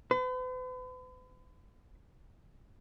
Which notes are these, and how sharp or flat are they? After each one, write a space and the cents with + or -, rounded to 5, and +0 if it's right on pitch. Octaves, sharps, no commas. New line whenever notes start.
B4 +45